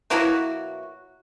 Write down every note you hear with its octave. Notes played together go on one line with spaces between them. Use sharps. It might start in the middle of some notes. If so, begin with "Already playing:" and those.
B2 F#3 A#3 E4 F#4